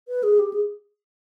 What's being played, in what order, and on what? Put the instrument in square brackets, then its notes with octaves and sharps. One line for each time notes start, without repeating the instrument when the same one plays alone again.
[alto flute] B4
G#4
G4
G#4